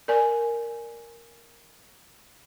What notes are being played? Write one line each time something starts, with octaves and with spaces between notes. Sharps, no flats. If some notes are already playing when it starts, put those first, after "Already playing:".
A#4 D5 G#5